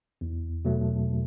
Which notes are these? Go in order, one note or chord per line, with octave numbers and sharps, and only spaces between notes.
E2
B2 F#3 A3